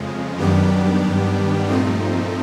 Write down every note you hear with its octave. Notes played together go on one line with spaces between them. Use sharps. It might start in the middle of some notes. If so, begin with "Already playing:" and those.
Already playing: F2 C#3 F3 G#3
F#2 D#3 G3 B3 D4 G4
G2
A#2 F3 A3 C4 D#4